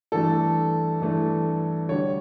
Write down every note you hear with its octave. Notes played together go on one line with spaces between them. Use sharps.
G2 E3 A3 A4
G2 E3 A3
D2 D3 G3 C#5